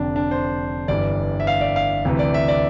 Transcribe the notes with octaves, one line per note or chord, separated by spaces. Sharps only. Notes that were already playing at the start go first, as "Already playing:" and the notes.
Already playing: F1 F2 D3 D4
D4
C5
G1 G2 E3 D5
E5
F5
D5
F5
D2 C3 E3
D5
E5
D5